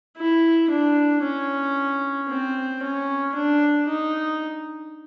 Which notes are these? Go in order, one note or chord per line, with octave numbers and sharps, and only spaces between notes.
E4
D4
C#4
C4
C#4
D4
D#4